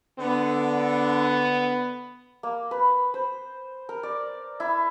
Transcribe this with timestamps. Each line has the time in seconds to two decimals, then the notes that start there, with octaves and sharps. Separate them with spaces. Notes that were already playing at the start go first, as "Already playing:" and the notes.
0.19 D3 B3
2.43 A#3
2.71 B4
3.14 C5
3.89 A#4
4.03 D5
4.60 E4